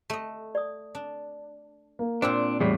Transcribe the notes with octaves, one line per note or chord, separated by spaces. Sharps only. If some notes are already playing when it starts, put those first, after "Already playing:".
A3 D#5
D5 D#6
D4
A#3
A#2 C4 D4 F4 C5 G5 E6
E2 A2 G3 G#4